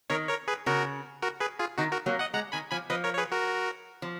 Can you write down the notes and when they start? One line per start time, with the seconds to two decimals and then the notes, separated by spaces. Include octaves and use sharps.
0.10 D#3 A#4 C#5
0.29 A#4 C#5
0.48 G#4 B4
0.66 C#3 F#4 A#4
1.22 F#4 A#4
1.40 G#4 B4
1.59 F4 G#4
1.77 D#3 D#4 F#4
1.92 F#4 A#4
2.06 F#3 A#3
2.19 D#5 F#5
2.34 G#3 F#5 A#5
2.52 D#3 G#5 B5
2.71 F3 G#5 B5
2.90 F3 B4 D#5
3.04 A#4 C#5
3.14 C#5
3.18 G#4 B4
3.32 F#4 A#4
4.02 F3